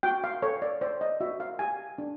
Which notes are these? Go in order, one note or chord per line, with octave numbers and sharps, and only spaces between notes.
F#4 G5
F5
A4 C#5
D5
C5 D5
D#5
F#4 E5
F5
G4 G#5
D4